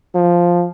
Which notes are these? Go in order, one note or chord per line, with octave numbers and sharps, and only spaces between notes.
F3